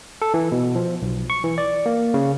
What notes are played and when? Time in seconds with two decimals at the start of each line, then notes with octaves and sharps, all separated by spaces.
0.22 A4
0.34 E3
0.52 B2
0.76 F3
1.02 B1
1.30 C#6
1.44 E3
1.58 D5
1.86 A#3
2.14 C#3